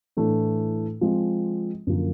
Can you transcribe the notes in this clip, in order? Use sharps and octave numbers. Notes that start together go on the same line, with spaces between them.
A2 E3 A3 D4
F3 G#3 C4
F#2 D3 F3 A#3